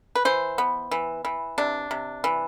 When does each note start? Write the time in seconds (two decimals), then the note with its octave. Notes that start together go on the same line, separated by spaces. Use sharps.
0.15 B4
0.25 E3 C5
0.58 B3
0.91 E3
1.25 E3
1.58 C3 D4
1.91 C3
2.24 E3